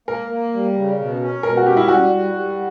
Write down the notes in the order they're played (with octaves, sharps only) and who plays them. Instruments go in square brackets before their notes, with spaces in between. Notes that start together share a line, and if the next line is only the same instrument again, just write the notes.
[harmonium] A#3 [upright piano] A#4
[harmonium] A#3
G3
C#3
B2
C#4
[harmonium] B2 [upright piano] A#4
[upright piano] F#4
[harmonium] C#4 [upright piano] G4
[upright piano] E4
[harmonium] G3 [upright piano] F#4
[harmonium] G3
G3